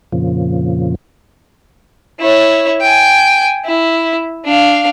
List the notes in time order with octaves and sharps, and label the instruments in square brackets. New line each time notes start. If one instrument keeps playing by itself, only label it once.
[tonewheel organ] F2 A#2 C#3 F3
[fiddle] E4 C#5
G5 G#5
E4
D4 F5